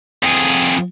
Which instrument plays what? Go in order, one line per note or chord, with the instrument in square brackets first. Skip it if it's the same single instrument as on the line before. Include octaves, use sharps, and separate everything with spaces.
[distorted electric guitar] F2 G#4